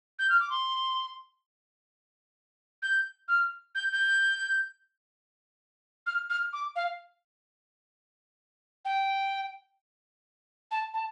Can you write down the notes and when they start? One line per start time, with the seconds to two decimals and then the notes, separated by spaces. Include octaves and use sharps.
0.19 G6
0.30 F6
0.40 D6
0.50 C6
2.82 G6
3.28 F6
3.75 G6
3.92 G6
6.07 F6
6.30 F6
6.53 D6
6.76 F5
8.85 G5
10.71 A5
10.94 A5